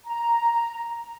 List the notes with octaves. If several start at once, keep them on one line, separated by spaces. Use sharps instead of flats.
A#5